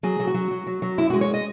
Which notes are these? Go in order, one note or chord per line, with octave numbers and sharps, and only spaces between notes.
F#3 G#4
F#3
F#4
F#3
F#3
F#3
F#3
F#2 E4
G#3 F#4
C#5
D#5